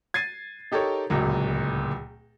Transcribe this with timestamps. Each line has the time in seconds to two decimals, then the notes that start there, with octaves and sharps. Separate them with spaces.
0.14 G#6 A6 C7 D#7
0.72 D#4 G4 A4 A#4 C#5
1.10 D1 C#2 A#2 F#3